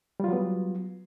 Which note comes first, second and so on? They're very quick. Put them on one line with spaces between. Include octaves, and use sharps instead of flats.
G3 F4 F#3 B3